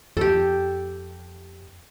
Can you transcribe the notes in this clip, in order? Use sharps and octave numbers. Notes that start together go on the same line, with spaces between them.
F2 G4 A4